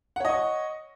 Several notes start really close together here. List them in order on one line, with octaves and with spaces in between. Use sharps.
F#5 C#5 D#5 C#6